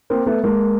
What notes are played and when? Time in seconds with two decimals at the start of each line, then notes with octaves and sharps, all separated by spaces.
0.10 A#3 C4
0.26 A3 B3
0.44 G#3 A#3